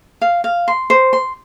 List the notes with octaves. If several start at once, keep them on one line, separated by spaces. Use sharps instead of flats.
F5
F5
C6
C5
C6